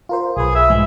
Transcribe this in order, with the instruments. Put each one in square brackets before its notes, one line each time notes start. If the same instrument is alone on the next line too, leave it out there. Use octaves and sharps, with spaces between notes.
[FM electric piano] F4 A#4 C5
[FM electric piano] B1 B4 [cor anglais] G#4
[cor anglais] E5
[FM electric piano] G#2 F3 G#3